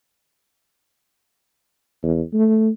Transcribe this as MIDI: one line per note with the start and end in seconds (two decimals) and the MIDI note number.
2.03 2.22 40
2.33 2.70 57